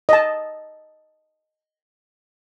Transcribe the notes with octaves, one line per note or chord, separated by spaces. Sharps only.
D#5 A5